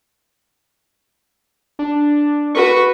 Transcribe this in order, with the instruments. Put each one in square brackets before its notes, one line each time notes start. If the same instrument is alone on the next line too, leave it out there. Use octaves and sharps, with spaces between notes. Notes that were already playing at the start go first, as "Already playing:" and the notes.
[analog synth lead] D4
[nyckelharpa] F#4 B4 [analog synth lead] C#6